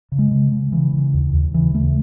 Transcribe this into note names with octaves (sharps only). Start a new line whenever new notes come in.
C#3
G#3
C#3
C#3
C#3 E3
C#3
D#2
D#2
C#3 E3
C#3 A3